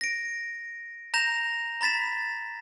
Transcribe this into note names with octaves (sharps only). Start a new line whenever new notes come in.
A#6 D7
A#5 G6 A#6 E7 F7
A#5 B5 A6 B6 E7